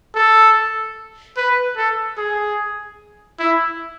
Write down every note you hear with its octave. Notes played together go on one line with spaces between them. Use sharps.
A4
B4
A4
G#4
E4